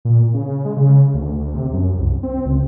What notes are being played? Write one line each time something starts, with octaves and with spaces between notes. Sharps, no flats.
A#2
C#3
G#3
C#3
D2
C3
F#2
C2
C4
C#2